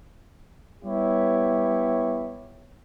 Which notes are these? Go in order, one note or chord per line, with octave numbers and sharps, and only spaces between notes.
G3 B3 E4 G4 C#5